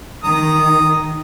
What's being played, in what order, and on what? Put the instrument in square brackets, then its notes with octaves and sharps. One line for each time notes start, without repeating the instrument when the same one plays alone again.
[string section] D#3 [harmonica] A#5 D#6